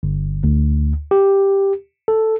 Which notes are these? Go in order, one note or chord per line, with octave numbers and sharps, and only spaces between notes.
G1
D2
G4
A4